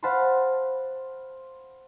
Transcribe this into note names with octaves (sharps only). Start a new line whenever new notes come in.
C5 F5 F#5 A5 B5 C6